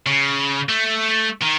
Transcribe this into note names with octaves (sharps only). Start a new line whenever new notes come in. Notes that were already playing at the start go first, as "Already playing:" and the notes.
C#3
A3
D#3